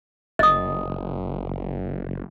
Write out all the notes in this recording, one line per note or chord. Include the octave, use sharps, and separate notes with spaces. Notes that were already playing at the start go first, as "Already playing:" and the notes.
F#1 D#5 D#6